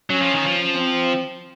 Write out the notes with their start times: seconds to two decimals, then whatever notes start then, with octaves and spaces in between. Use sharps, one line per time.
0.10 F#3 C#4
0.22 F3
0.35 D#3
0.46 F3
0.75 C4